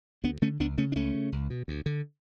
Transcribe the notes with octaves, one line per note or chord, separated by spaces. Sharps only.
D2 B3 D4
D3 A3 C#4
C#2 B3 D4
C#3 A3 C#4
D4
C#2 A3 C#4
C#3
C#2
B2
D2
D3